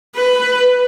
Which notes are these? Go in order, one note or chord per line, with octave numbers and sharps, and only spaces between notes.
B4